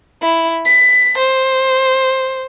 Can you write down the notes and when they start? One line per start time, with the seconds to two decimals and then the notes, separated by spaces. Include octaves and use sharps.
0.22 E4
0.65 B6
1.18 C5